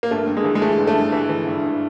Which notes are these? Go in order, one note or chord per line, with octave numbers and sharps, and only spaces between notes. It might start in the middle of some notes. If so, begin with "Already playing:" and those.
A#3
G2 A3
G2
G#3
E3
G#3
E3 A3
G2
A3
G2
E3
E3
G2
G2